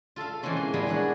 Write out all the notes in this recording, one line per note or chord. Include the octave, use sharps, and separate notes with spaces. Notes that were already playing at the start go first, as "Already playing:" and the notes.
F4 A4 E5 F5
E3 G#3 A#3 C4 C#4
C6
G3 G#3 A#3 B3 E4 G#4
D4 C#5 F#5